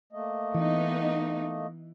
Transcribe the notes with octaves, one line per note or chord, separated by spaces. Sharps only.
A3 A#3 D#5
E3 B3 D#4